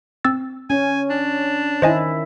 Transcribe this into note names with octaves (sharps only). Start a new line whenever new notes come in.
C4 E6 A6
C#4 G#5
D4
D#3 E4 C5 D#5 G#5